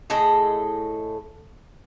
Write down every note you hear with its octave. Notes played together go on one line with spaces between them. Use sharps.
A2 G#4 A4 D#5